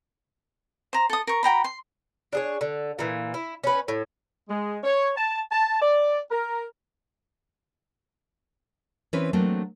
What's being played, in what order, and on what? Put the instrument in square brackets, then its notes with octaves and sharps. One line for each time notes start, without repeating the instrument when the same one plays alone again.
[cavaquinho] C5 A#5
A4 D#6
A#4 C#6
F#4 G5 A#5 B5
C6
[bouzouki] D4 G#4 C#5
D3
A#2 E3
E4
C#4 B4
A2
[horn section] G#3
C#5
A5
A5
D5
A#4
[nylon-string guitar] E3 C4 C#4 B4
F#3 A3 A#3 C4 D4